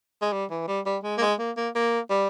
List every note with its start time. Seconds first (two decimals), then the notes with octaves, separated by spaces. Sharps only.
0.22 G#3
0.32 G3
0.51 E3
0.68 G3
0.86 G3
1.03 G#3
1.18 A#3
1.21 G#3
1.39 A#3
1.57 A#3
1.75 A#3
2.10 G3